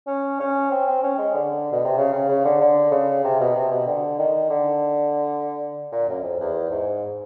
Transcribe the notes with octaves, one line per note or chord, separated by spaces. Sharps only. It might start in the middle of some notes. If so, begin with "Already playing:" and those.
C#4
C#4
C4
C4
C#4
G#3
D3
B2
C3
C#3
C#3
C#3
D3
D3
C#3
C3
B2
C3
B2
D3
D#3
D3
A#2
F#2
F2
E2
G#2